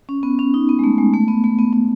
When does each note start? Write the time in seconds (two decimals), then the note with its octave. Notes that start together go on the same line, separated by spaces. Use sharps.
0.09 C#4
0.23 B3
0.39 C#4
0.54 D#4
0.69 B3
0.79 G#3
0.84 A3
0.98 G#3
1.13 A3
1.28 B3
1.44 A3
1.59 B3
1.73 B3